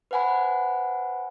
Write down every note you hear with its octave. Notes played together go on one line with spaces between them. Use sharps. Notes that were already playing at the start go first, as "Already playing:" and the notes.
B4 C5 F#5 G#5 B5